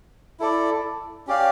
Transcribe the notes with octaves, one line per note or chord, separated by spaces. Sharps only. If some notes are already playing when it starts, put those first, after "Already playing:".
E4 A4 D5
C#4 G4 D5 F5